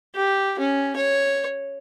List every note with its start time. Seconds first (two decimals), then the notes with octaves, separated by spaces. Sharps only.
0.15 G4
0.59 C#4
0.96 C#5